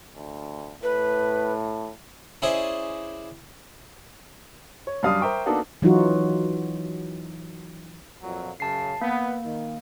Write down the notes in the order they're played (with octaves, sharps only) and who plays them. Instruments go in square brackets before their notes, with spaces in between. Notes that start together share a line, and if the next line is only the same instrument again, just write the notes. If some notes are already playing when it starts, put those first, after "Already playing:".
[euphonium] D2
[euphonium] A2 [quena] B4
[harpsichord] C#4 E4 G#4 C5 D5 D#5
[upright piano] C#5
F#2 G3 D4 F5 D#6
A#4 C5 E5 G5 C#6 D6
A#3 B3 D4 D#4 F#4 A4
[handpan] E3 F#3 D#4 F4 F#4
[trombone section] F2 A#2 F#3
[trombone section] F#2 C#3 [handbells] A5 C7
[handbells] A#3 [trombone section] B3
[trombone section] D#3